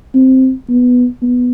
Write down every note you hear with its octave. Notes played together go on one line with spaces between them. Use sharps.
C4
B3
B3